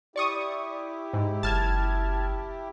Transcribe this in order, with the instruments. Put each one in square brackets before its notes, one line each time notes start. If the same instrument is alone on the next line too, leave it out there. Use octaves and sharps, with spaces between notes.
[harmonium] E4 G4 [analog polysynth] D5 C#6 D#6
[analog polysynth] G#2
[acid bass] F#1 [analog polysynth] A5 F6 G#6